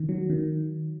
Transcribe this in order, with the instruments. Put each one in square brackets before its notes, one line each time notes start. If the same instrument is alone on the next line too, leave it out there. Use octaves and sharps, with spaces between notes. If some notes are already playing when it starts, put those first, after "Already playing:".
Already playing: [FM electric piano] D#3
F#3
D#3